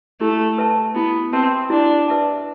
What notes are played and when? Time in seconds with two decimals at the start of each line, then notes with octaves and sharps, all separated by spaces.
0.21 A3 E4
0.58 B4 E5 A5
0.95 B3 E4
1.33 C4 B4 E5 A5
1.70 D4 E4
2.08 B4 E5 A5